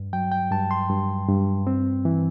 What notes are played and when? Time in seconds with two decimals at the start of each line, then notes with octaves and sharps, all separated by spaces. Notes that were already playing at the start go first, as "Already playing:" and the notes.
Already playing: G2
0.13 F#3 G5
0.32 G5
0.51 G2 A5
0.71 C6
0.90 G2
1.28 G2
1.67 C4
2.05 E3